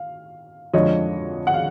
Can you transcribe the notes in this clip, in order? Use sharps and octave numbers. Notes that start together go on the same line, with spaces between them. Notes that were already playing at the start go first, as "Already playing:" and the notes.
Already playing: F5
F2 D3 F3 G#3 C#5 D#5
F#5
F5